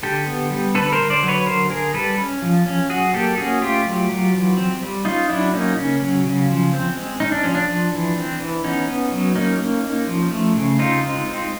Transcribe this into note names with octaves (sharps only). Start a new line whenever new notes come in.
D3 G4 A4
B3
G3
D3 A4 B4
A#4 C5
D3
C5 D5
F#3
B4 C#5
D3 A#4 C5
D3 G#4 A#4
G3 A4 B4
C#4
F3
C#4
F#3 F#4 G#4
A#3 G4 A4
C#4 F#4 G#4
A3 F4 G4
F#3
F#3
E3
C4
G3
C#4 D#4 F4
F#3 D4 E4
A#3 C#4 D#4
C#3 C#4
F#3
C#3
F3
C4
G#3
C#4 D#4
D4
F3 C#4
D4
F3
E3
C4
E3
B3 C#4 D#4
B3
F#3
A#3 C#4 D#4
A#3
A#3
F3
A3
C#3
C4 D#4 F4
G#3
C4